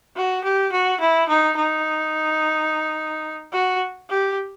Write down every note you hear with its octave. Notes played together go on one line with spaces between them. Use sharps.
F#4
G4
F#4
E4
D#4
D#4
F#4
G4